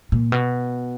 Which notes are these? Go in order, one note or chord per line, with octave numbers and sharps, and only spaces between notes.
A#2
B2